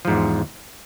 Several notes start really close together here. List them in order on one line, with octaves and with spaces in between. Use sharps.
F3 G#2 E2